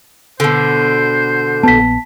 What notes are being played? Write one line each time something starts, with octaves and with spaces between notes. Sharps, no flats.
B2 D3 C5
A#1 B3 A5 B6